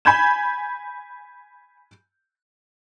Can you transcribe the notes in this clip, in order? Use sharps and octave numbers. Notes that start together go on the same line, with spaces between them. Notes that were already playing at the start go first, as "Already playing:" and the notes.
G#5 B5 G6 G#6 E7